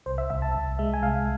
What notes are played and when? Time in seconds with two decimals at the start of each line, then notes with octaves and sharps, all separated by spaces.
0.06 C2 C5
0.18 E5
0.30 C2 E5
0.42 A5
0.54 C2
0.79 G#3 E5
0.94 G#5
1.02 C2 F5